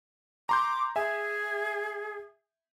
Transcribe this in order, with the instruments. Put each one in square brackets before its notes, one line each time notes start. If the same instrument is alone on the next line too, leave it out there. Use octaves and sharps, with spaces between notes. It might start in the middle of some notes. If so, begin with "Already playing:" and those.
[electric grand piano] A#5 C6 G6 [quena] D6
[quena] G#4 [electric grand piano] E5 G#5